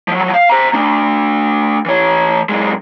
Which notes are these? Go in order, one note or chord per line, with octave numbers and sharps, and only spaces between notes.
F3 F#3
F5
C5 A#5
A3 D4
E3 C#5
F#2 G#3